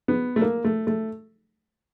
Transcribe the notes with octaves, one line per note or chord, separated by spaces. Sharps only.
B3
A3
A#3
A3
A3